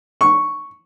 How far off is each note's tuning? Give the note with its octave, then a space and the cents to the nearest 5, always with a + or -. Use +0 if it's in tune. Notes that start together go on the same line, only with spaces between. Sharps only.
C#6 +0